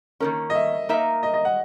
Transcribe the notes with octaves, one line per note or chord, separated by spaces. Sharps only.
D#3 F#3 A#3 C#4 A#4
D#5
E5
A#3 D#4 A#4 E5
D#5
D#5
F#5